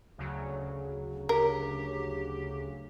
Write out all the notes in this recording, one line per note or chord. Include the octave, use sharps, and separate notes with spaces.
D2 C#3 F#3
G4 A#4